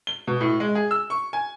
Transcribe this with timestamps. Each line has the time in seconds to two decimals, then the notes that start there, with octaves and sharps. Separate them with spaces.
0.07 G7
0.27 B2
0.41 A2
0.60 G#3
0.75 G#4
0.91 E6
1.10 C#6
1.33 G#5